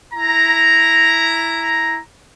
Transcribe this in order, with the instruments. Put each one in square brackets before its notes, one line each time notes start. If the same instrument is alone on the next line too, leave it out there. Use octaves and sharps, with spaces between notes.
[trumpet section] E4 A#5